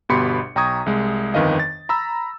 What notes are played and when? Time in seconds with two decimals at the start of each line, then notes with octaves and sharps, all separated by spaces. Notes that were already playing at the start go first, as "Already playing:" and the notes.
0.09 G1 B2 G4 B5 C6 C#7
0.56 B1 G5 A#5 C#6 D#6 G#6
0.86 C2 G#3
1.34 G1 F2 D#3 B4 D#5 F5
1.59 A6
1.89 A#5 B5 E6